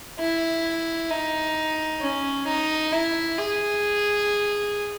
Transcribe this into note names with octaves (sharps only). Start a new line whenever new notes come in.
E4
D#4
C#4
D#4
E4
G#4